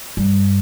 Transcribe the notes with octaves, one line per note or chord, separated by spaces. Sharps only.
G2